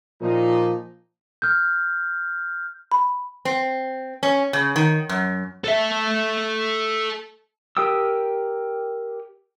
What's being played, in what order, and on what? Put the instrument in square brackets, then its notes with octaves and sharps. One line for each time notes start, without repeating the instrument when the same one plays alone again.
[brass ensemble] A#2 D#4 [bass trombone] F3
[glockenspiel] F6 G6
[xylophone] B5
[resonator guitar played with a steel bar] C4
C#4
C#3
D#3
F#2
[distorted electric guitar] A4 E5
[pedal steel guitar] G4 A#4 G5 D#6 E6